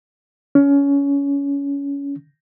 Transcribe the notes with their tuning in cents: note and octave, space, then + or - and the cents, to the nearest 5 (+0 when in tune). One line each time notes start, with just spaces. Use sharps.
C#4 +20